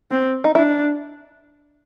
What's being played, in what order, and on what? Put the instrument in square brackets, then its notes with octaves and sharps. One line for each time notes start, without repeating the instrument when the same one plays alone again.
[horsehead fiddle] C4
[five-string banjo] D#4
[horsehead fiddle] D4 [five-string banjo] E4